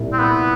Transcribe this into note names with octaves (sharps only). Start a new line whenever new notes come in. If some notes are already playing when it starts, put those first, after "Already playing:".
Already playing: C2 A#2
C4
B3